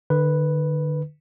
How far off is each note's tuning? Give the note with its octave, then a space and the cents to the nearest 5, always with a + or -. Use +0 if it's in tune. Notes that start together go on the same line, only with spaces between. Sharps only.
D3 +35 B4 +0